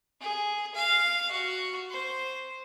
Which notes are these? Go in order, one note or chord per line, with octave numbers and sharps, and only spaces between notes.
G#4
F5
F#4
C5